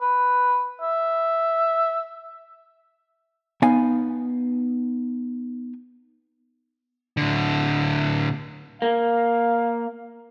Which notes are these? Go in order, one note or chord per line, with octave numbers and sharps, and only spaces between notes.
B4
E5
B3 D#4 F5 G#5
A2 D3
A#3 F5